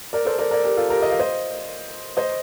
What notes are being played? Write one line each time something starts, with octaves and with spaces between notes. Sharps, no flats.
A#4 D5
A4 C5
A#4 D5
A#4 D5
G4 A#4
F4 A4
G4 A#4
D#5
F5
C5 D#5
C5 D#5